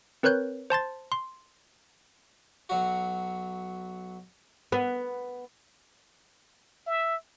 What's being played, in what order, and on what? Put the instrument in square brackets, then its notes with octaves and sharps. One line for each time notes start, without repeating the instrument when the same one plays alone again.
[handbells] C4 A#4 B4 C#5 F#6 G6
C5 A5 C6 A6
C6
[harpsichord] B1 F#3 F#4
[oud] B3
[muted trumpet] E5